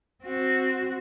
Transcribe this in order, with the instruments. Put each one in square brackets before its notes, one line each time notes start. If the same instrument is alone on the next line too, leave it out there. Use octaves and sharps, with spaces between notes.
[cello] C4 F#4